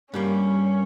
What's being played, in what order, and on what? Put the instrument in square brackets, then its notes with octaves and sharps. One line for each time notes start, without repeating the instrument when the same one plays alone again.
[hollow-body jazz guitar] G2 G3 A#3 [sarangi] C#4